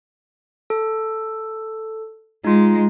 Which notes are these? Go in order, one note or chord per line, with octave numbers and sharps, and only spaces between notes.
A4
G#3 D#4 F4